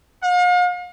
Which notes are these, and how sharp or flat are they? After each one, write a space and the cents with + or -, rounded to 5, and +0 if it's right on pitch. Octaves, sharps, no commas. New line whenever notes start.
F5 +45